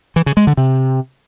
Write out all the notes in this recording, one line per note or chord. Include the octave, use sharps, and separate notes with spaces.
E3
C#3
G#3
D3
C3